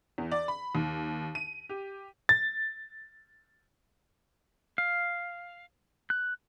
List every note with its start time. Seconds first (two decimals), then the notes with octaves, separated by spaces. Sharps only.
0.18 E2
0.32 D5
0.48 B5
0.75 D#2
1.35 D#7
1.69 G4
2.29 A6
4.78 F5
6.10 F#6